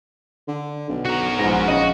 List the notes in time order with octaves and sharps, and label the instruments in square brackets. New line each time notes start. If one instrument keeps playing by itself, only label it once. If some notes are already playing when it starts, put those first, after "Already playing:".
[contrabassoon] D3
B1
[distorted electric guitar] F#4 A#4
[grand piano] A#1 A#6 [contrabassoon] G#2
[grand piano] A#1 D#5 D#7 [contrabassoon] C#3 [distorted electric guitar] F#4